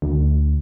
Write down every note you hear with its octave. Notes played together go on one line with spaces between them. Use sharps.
D2